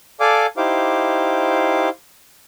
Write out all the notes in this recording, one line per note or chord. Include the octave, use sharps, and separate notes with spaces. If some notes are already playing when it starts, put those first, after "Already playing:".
A4 D5 F5 G#5 D6
D#4 E4 G4 C5 F5 D6